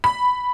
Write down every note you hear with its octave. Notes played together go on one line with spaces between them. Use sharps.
B5